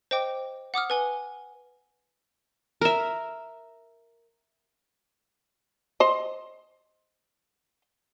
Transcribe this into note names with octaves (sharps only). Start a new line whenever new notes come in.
C5 D#5 G5 D6
F#5 D6 D#6 F6
B4 G#5 G7
A#4 E5
C5 D#5